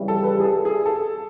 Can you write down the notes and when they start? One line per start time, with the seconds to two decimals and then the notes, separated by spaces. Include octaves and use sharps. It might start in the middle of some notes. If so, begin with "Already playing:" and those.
Already playing: F2 C#3 E3 G3
0.08 A4
0.24 B4
0.40 G#4
0.44 A4
0.65 G#4
0.86 A4